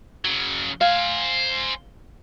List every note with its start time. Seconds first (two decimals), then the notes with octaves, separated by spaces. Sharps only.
0.25 C#3 F#3
0.81 C5 F5 G#5